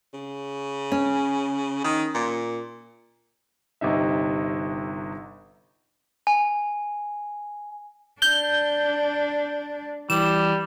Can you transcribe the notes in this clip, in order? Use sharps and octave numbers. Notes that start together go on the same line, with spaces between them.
C#3
C#4
D#3
A#2
G1 C3 D#4 E5
G#5
D4 G6 G7
E3 G3 E7